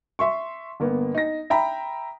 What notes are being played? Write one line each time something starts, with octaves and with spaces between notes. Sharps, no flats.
E5 C6 C#6
G1 A#3 B3
D#4 A#6
E5 G5 A#5 B5